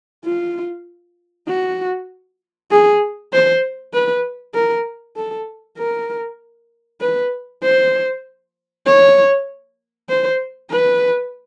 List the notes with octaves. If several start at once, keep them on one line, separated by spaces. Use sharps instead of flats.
F4
F#4
G#4
C5
B4
A#4
A4
A#4
B4
C5
C#5
C5
B4